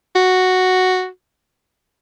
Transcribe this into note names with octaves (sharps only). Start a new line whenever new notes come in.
F#4